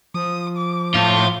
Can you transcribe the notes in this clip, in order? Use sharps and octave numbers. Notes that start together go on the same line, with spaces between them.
F3 D#6
D6
A2 F4